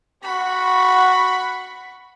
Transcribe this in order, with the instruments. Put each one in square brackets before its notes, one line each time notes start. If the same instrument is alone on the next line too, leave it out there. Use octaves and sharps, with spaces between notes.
[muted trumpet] F#4 [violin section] F#5 B5 C#6